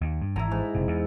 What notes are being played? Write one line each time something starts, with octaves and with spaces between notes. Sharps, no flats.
D#2
G2
G#1 E3 E4 A#5
G#2
F#1 C3
E2